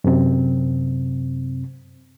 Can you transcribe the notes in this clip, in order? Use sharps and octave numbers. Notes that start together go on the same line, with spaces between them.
F#2 C3 C4